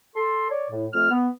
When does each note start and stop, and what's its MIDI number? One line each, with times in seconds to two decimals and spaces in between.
0.15 0.47 69
0.15 0.47 84
0.50 0.68 73
0.50 0.68 74
0.71 0.86 45
0.93 1.10 41
0.93 1.10 57
0.93 1.10 89
1.10 1.27 59